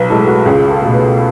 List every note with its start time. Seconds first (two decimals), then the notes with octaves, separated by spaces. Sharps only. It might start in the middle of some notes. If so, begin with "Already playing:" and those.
Already playing: B1 B4
0.10 A2 G#3 A4
0.27 F#4
0.46 C#2 G#4
0.70 A4
0.82 B2 A3
0.94 B4